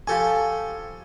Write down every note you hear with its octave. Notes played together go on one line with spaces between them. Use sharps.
F3 G4 A4 G#5 C#6